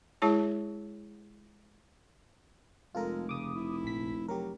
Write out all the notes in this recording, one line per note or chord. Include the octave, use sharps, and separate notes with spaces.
G#3 E4 G#4 C#5 A5
F1 G#3 F4 A4 A#4
C#3 D6 D#6
E4
A#1 B6
F#3 G4 A#4